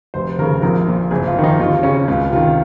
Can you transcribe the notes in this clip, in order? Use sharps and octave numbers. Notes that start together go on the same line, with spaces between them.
F1 C5
D#2 C#3 A#4
A#1 A#4
A#2
F#1 G#4
F4
F2 D#3
D#4
D#2 F4
C#3 C#4
C#2 F4
C3 D#3 F4